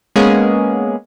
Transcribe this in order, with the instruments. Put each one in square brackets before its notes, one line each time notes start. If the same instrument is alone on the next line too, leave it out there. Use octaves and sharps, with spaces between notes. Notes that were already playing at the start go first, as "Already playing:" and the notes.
[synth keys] G#3 A#3 B3 C#4 G#4